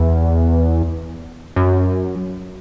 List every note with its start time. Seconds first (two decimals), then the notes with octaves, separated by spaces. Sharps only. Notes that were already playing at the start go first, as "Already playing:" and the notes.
Already playing: E2
1.56 F#2